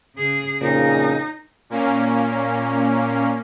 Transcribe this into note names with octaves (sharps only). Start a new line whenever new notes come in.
C#3 G#4
F2 A#2 C#3 D#4
A#2 A#3 C#4